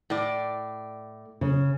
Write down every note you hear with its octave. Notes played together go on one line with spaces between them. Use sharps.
A2 D5
C#3